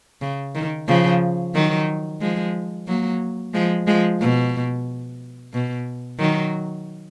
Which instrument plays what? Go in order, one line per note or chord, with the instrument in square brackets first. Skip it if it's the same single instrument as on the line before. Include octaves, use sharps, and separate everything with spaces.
[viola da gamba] C#3
D#3
C#3 F3
D#3 F#3
F3 G#3
F#3 A#3
F3 G#3
F3 G#3
B2
B2
D#3 F#3